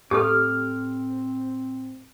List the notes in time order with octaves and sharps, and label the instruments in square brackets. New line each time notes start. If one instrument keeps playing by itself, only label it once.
[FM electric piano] A2 [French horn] C4 [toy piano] G4 A4 [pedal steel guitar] D6 F6